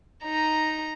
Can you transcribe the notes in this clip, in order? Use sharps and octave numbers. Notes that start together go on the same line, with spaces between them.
D#4 A#5